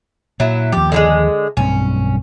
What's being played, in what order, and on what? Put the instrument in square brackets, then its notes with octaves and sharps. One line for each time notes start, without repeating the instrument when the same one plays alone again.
[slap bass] A#2 [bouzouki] F#3 E4
[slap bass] D#2 F3 [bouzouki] G4
[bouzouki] D3 F#3 G#3
[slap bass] B1 G2 C4 [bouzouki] C#4